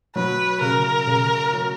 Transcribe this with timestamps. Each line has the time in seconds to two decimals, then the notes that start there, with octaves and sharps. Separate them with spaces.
0.15 F#3 B4
0.61 C#3 A#4
1.07 C#3
1.53 F#3